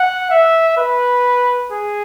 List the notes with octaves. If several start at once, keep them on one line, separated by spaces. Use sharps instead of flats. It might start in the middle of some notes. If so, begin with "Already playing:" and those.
Already playing: F#5
E5
B4
G#4